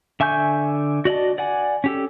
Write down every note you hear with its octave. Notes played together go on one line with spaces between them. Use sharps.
D3 E5 G#5 C#6 G6
F#4 D5 D#5 A5
D5 F#5 G#5
C#4 G4 A4